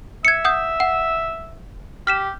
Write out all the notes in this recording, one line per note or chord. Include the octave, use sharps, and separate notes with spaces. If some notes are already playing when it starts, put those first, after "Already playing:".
E5 G#6 C#7
F#5 D#6 G6
F#5
G4 F6 B6 E7